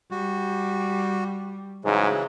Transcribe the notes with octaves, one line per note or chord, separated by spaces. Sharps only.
G3 F#4
G#2 C#3 E3 F#3